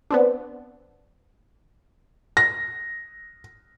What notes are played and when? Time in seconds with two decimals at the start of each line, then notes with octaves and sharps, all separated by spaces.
0.10 B3 C4 D4
2.37 A#6